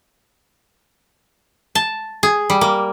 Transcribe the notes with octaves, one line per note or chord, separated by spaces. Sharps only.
A5
G#4
G3
A#3